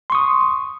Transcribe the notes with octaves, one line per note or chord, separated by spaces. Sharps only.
C6 C#6 D#6